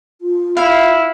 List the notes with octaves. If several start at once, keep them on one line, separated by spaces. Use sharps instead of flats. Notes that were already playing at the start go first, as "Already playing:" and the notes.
F4
E4 F5